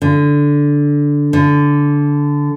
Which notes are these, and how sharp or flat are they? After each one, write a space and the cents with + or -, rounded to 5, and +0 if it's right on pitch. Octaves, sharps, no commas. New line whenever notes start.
D3 -10
D3 -15